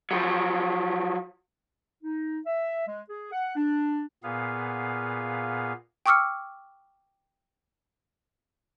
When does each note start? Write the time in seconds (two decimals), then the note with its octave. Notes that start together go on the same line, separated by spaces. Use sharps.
0.11 F3 F#3
2.04 D#4
2.46 E5
2.87 G#3
3.09 G#4
3.32 F#5
3.56 D4
4.23 A#2 B3 G#4 F5
6.06 G5 C#6 D6 E6 F6 C#7